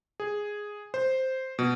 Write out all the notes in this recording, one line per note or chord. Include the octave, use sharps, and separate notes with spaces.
G#4
C5
B2